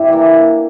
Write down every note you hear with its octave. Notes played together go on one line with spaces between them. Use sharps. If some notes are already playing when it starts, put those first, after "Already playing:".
Already playing: G2 G3 E4
E3 A#3